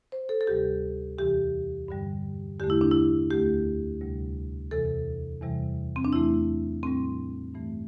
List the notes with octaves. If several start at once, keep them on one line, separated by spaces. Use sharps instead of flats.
C5
A4
A4
D2 C3 G3 G4
E2 C3 E3 G4
G2 D3 G3
E2 D3 A3 G4
E4
D4
E4
D2 D3 A3 G4
D2 C3 G3
E2 C3 E3 A4
E2 C3 E3 G3
C4
D4
E2 E3 A3 E4
A2 G3 C4
G2 E3 A3